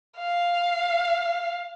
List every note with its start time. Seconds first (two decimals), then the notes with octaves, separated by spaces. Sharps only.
0.18 F5